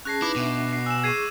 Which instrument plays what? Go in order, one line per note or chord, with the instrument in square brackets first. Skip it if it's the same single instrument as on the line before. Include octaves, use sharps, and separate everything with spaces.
[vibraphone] C#4 G#4 A5 [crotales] F#6 A#6 C7
[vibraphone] D#4 B4 [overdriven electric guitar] E4 [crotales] D6
[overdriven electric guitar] B2 [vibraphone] D4 E5
[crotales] C7
[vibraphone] G#5 [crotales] E6 E7
[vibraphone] G#4 C#6 [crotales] G#6 C7 D#7